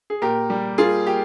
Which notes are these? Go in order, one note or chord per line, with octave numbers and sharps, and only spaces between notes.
G#4
A#2 G4 A#4
G3
A#3 F4 G#4
A#3 G4